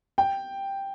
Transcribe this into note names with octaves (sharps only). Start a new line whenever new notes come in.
G5